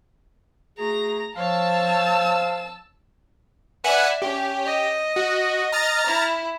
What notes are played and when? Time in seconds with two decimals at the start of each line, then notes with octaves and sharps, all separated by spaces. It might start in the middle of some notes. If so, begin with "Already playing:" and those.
0.78 A3 F#4 G#4 A#5
1.36 F3 C5 C#5 F5 A5 E6 A6
3.84 B4 D5 E5 F#5 G#5
4.22 C#4 G4
4.66 D#5
5.16 F#4
5.72 A#5 F6 A6
6.07 E4